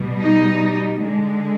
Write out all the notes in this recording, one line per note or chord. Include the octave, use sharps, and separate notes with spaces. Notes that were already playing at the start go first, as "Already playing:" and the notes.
Already playing: B2 G3
D#4
D3 G#3